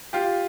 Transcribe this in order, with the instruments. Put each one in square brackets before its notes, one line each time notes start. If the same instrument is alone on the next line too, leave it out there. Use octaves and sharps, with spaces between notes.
[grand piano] F4 G4